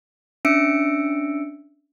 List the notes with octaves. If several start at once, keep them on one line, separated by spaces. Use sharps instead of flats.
C#4 D4 E5 E6 C#7 D7